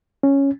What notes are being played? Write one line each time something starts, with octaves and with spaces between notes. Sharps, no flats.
C#4